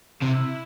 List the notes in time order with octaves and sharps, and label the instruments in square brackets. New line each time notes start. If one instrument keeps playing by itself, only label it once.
[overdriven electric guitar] C3 [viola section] E4